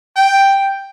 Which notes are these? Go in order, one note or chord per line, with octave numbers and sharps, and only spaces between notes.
G5